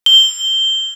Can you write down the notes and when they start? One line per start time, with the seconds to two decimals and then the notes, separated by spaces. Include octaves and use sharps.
0.06 G7